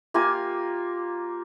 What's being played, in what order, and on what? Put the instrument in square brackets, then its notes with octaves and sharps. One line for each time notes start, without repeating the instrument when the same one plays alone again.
[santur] A#3 F4 G4 G#5